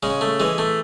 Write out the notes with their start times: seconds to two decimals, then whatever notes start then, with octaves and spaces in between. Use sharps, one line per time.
0.03 C#3 G#3
0.21 A3
0.40 E3 G#3
0.58 A3